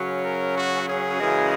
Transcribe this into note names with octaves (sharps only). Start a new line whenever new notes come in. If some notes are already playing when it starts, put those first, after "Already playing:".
Already playing: F#2 C#3 F#3 C#4
A#4
F#4
G#4
F#2 C#3 E3 G#3